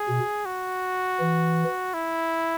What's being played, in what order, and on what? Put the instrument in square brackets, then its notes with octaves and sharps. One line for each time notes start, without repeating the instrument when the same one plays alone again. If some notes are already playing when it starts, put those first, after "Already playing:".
Already playing: [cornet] G#4
[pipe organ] B2
[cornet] F#4
[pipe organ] E3
[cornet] E4